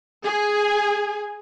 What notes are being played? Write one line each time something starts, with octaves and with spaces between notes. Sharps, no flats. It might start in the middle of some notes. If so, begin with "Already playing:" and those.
G#4 G#5